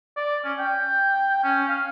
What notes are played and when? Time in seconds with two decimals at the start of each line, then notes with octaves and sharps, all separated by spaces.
0.17 D5
0.44 C#4
0.59 G5
1.43 C#4
1.68 F5